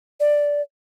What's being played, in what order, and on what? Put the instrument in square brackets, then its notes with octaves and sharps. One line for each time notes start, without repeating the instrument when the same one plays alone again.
[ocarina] D5